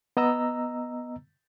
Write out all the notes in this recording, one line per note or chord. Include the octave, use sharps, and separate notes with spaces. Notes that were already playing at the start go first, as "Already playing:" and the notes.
B3 D#5 A#5 E6